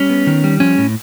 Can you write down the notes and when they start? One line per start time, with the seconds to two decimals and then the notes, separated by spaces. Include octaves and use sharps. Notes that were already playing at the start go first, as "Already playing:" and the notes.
Already playing: G3 C#4
0.10 B3
0.27 D#3
0.44 G3
0.60 F3 C#4
0.78 A2